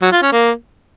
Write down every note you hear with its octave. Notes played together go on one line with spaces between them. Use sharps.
F#3
F4
C#4
A#3